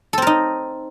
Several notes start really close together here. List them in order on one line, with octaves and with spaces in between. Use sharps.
A4 C4 A#4 D#4